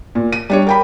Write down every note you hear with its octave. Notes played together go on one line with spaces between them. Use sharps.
A#2
D#7
G3 D4 C#5
A#4 G5 B5